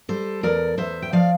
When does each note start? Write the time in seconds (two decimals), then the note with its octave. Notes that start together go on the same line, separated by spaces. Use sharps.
0.09 G3 A4 C5
0.43 E2 A#4 D5
0.77 E2 C5 E5
1.02 G5
1.13 F3 D5 F5